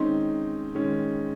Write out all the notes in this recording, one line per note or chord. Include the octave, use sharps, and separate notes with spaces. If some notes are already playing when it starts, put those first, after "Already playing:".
Already playing: D#3 G#3 C4 C#4 D#4
D#3 G#3 C#4